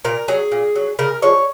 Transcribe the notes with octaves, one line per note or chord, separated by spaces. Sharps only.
A#2 A#4
F#3 G#4
A#2
F#3
C#3 A#4
F3 G#3 C#5